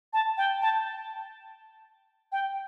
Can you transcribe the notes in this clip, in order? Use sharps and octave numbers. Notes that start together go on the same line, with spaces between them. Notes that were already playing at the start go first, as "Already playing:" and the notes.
A5
G5
A5
G5